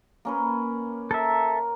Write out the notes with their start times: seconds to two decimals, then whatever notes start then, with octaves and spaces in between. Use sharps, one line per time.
0.25 A#3 C#4 B4
1.11 A4 A#4 E5